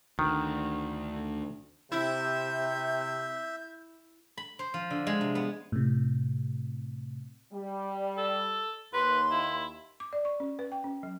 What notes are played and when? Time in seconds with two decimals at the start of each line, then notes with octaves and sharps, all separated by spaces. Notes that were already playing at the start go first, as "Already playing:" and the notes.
0.19 D2 D#3
1.92 C3 E4 E5 G6
4.37 B5
4.59 C5
4.74 F3
4.90 D3
5.07 G#3
5.21 C3
5.35 B3
5.72 A2 C3
7.52 G3
8.18 A4
8.93 D#2 B4 C6
9.31 E4
10.00 D6
10.13 D5
10.25 C#6
10.40 C#4
10.59 B4
10.72 G5
10.84 C#4
11.03 F#3